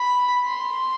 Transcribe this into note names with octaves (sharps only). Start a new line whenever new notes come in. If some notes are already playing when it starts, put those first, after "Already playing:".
Already playing: B5
C6